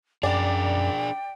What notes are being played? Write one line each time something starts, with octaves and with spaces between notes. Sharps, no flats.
F#2 D4 G#4 D5 G5